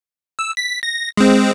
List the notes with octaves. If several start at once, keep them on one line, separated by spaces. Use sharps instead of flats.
E6
B6
A#6
G#3 C4